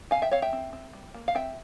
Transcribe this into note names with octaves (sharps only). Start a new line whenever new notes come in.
C4 F5 G#5
E5 G5
C4 C#5 F5
E5 G5
C4
C4
G3
A#3
F5
C4 E5 G5